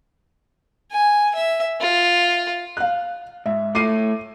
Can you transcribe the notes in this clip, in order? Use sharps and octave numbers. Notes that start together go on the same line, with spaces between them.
G#5
E5
F4
F5 F#6
G#2 E5
A3 E4 D6 C7 D#7